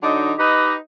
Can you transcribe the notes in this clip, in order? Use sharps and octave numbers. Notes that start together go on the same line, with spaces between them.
D3 F#3 D#4
D#4 G4 B4 D#5